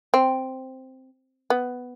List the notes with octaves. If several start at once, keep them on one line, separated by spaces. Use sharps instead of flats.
C4
B3